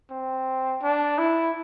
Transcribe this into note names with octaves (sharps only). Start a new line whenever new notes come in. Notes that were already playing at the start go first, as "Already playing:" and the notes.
C4
D4
E4